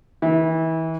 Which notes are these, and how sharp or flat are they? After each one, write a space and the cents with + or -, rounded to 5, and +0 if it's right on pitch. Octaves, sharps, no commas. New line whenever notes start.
E3 -30